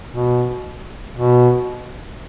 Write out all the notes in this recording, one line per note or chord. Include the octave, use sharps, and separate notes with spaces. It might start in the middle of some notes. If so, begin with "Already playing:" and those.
B2
B2